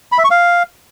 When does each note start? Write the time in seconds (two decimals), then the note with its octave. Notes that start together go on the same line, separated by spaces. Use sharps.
0.12 B5
0.18 E5
0.24 C#6
0.31 F5